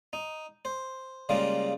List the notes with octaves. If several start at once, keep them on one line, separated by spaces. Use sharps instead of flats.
D#4
C5
C#3 G3 G#3 A#3 F4